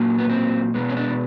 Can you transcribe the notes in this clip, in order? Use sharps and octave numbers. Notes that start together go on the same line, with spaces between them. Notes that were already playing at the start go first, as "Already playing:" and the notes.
Already playing: A#2 F#3 A#3
B3
C4
B2 G#3 B3
C#4
D4